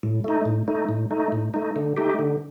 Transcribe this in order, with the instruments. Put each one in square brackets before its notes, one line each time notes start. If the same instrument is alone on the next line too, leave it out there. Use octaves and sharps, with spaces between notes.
[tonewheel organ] A2
A3 D#4
A2
A3 D#4
A2
A3 D#4
A2
A3 D#4
D3
A3 D#4 G4
D3